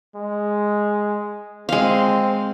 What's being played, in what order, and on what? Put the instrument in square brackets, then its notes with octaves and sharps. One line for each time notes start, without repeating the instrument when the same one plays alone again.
[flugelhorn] G#3
[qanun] G#3 F5 [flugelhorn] C4